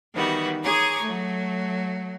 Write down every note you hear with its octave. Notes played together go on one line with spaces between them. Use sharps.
D#3 E3 G3 B3 F#4
G#4 C#5 G#5 A#5 C#6 D6
F#3 A3